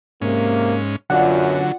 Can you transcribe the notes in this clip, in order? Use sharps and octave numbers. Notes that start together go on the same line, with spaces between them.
G#2 C3 A#3 C#4
F#2 B2 D3 F#3 C#4 F4 D5 F#5